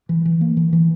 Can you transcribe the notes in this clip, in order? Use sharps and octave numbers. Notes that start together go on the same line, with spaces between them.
E3
E3
A#3
E3
E3